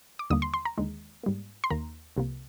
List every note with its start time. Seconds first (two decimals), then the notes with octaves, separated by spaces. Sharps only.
0.19 D6
0.30 D#2 D3 G3 A#3 D#6
0.42 C6
0.54 C6
0.65 A#5
0.78 D#2 D3 G#3
1.23 G#2 G3 A#3
1.64 C6
1.70 D#2 D#3 A#3 A#5
2.17 C2 C3 F3 A#3